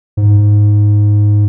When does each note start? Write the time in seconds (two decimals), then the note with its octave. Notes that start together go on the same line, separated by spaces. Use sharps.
0.17 G#2